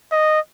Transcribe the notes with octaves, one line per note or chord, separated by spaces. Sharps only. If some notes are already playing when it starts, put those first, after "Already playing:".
D#5